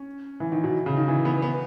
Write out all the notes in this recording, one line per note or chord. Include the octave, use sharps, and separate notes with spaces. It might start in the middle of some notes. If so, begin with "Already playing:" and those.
Already playing: C#4
E3
D#3
B2
C#3
D#3
E3
B3
B3